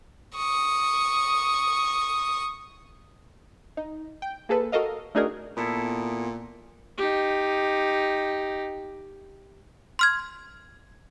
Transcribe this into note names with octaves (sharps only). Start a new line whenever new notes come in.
C#6 D#6
D#4
G5
A#3 G#4 A4 B4
F#4 A4 A#4 D#5 F5
A3 D4 D#4 F#4 G#4 A#4
A#2 B3 E4 A4
D#4 G4
C6 F6 G#6